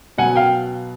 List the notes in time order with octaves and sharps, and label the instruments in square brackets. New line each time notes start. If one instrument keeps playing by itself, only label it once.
[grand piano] B2 F#3 F#5 G#5
F5 G5